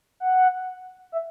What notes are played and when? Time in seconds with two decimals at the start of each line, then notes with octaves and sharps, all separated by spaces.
0.20 F#5
1.12 E5